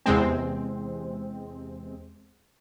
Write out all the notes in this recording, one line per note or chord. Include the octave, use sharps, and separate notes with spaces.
E2 C3 G#3 C4